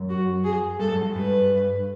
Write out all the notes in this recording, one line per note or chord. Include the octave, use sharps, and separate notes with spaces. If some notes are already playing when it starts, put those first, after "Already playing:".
Already playing: F#2
F#4
G#4
G2 A4
F#2
G2
G2 B4